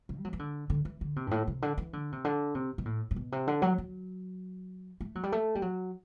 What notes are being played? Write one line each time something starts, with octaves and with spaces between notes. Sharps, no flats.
C3
G3
F#3
E3
D3
D3
E3
D3
C3
G2
A2
C3
D3
E3
D3
C3
D3
C3
B2
A2
A2
B2
C3
D3
F#3
F#3
A3
F#3
G3
A3
G3
F#3